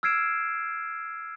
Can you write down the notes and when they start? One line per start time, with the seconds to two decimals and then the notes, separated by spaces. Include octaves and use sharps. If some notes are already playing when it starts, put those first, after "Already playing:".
0.03 E6 F6 G#6 C7 D7 E7